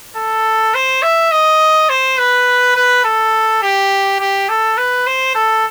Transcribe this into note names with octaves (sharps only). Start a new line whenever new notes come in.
A4
C5
E5
D#5
C5
B4
B4
A4
G4
G4
A4
B4
C5
A4